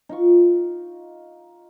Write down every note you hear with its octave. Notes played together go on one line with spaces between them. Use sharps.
D#4 F4 C#6